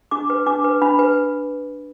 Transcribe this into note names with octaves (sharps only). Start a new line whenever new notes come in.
D4 D6
B4
D4 D6
B4
D4 B5
B4